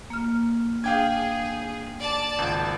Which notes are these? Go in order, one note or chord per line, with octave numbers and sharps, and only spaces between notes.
A#3 F6
D4 G#4 F5 G5 G#6
D5 A5 A6
G#1 C#2